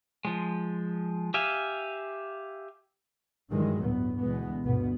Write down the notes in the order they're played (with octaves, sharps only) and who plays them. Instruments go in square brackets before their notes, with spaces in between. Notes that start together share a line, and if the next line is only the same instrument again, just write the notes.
[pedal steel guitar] F3 G#3
G4 E5 F5 G#5
[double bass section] G2 D#3 E3 F#3 G#3
G1 D2 A2 B3
D2 B2 E3 G#3 B3
G1 D2 B2 B3